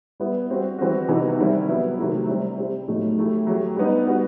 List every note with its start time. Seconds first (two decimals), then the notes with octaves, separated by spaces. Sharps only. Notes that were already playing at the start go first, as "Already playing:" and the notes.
0.20 G3 B3 E4
0.50 G3 C4 F#4
0.79 E3 G3 C4 F#4
1.08 C3 E3 B3 D#4 F#4
1.38 D#3 G3 C4 E4
1.69 F#3 B3 E4
1.99 C3 D#3 F#3 A3 E4
2.28 G3 C4 E4
2.58 G3 C4 E4 G4
2.88 A2 F#3 A3 D#4
3.18 F#3 A3 E4 G4
3.47 F#3 A3 E4 G4
3.77 G3 B3 D#4
4.07 G3 B3 F#4